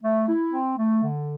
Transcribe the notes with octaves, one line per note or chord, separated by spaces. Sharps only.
A3
E4
C4
A3
D3